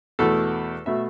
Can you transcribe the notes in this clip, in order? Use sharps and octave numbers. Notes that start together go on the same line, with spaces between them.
E2 B2 A3 A4
B2 A3 E5